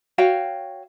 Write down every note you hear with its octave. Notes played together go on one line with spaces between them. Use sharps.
F#4 C#5 F5 G5